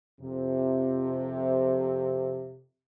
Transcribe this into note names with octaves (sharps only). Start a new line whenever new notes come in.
F2 C3